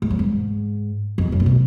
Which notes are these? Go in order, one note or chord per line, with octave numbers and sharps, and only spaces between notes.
G#2
F#2
G#2
F2
F#2
A#2
B2